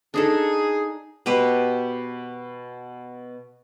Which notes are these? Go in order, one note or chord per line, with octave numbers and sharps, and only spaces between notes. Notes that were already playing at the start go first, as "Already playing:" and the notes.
D4 D#4 G#4 A4
B2 G4 B4 C5